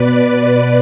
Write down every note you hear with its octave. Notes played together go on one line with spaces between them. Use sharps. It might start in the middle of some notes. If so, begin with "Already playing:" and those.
Already playing: B2 B4 D5